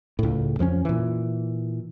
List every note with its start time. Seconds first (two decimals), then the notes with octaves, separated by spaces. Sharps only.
0.19 C#2 A2
0.59 F2 F3 A#3 C#4
0.85 A#2 E3